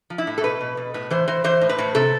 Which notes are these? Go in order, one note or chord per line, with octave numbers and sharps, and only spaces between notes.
F3
E4
A2
A4
B2 B4
B2
B2
A2 B4
E3 C5
E3 C5
E3 C5
A2
B4
A2
C3 A4